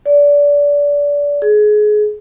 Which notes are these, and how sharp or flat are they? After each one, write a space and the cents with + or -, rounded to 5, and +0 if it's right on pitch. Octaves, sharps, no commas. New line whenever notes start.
D5 -25
G#4 +25